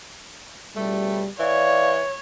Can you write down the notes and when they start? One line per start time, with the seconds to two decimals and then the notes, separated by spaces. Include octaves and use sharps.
0.76 C#2 B2 G3 A3
1.40 E3 C#5 D5 F5